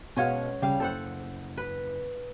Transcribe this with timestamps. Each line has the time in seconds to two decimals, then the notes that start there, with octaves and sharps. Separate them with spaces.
0.16 B2 G#3 C#4 C#5 F5 F#5
0.62 C#3 G3 F5
0.80 F#1 A4 C5 F#5
1.57 B4